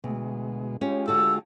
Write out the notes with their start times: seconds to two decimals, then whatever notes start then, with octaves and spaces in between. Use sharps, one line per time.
0.04 D2 B2 G#3
0.81 G#3 C#4 F4 G4
1.08 D3 F#4 A4 E6